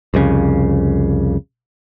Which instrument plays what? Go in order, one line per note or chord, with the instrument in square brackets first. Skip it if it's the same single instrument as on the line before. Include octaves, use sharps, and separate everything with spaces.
[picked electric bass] C2 F2 C#3